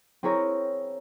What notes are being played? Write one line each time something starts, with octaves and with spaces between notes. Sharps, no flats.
C4 E4 G#4 A#4 C#5 A#5